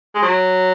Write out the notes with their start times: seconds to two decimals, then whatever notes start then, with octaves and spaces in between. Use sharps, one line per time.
0.15 G#3
0.23 F#3